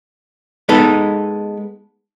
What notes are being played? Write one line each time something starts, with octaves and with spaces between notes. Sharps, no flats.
G#3 B3 D#4 A4